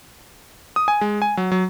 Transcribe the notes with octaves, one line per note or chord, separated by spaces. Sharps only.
D#6
G#5
G#3
G#5
F#3
F#3